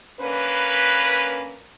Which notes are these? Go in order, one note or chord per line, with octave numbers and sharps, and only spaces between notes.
D3 A#3 C#4 B4